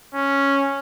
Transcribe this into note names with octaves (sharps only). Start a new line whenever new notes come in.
C#4